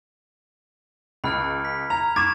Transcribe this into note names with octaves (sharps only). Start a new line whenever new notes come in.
C#2 B5 F6 A6
B6
A#5 G#6 F7
C#6 D6 G#6 A6 C7 E7